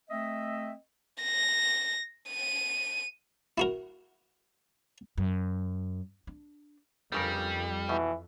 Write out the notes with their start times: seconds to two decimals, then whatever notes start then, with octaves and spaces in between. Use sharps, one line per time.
0.10 A3 C4 D#5 E5
1.23 A#6
2.30 D#7
3.58 E4 F#4 A#4
5.18 F#2
6.27 D4
7.12 G1 F2 C#3 G3 A#4
7.89 B2 E3